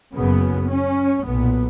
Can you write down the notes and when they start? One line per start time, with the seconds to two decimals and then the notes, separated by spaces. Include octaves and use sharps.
0.14 F#1 F#2 C#3 B3
0.70 C#4
1.26 B1 A#2 B3